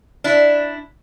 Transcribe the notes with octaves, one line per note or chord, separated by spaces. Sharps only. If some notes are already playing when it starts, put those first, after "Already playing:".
D4 E4